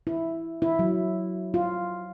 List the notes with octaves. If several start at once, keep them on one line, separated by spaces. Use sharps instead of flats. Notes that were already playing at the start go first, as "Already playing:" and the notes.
E4
E4
F#3
F4